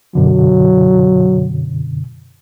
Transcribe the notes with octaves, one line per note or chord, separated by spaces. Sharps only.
F#2 B2 D3 F#3